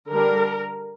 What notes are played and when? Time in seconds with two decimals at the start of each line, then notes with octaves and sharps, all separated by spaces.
0.11 D3 G3 D4 A#4